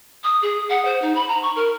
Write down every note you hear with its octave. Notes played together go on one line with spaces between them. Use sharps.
D#6
G#4
F#5
C5
D#4
B5
A#5
C#6
A#4